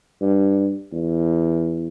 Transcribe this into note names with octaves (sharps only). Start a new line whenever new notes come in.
G2
E2